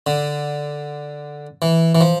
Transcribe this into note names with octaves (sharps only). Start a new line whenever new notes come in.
D3
E3
E3
F3